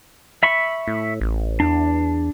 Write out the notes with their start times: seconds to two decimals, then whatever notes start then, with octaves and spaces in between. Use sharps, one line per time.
0.43 E5 B5 C#6
0.88 A2
1.21 A1
1.60 E2 D4